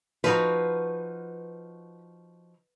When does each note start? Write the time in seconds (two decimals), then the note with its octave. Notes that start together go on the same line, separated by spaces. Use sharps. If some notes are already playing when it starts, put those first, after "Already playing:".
0.24 F3 D#4 F#4 B4